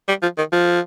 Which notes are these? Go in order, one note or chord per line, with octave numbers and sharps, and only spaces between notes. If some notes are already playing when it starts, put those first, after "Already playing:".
G3
F3
D#3
F3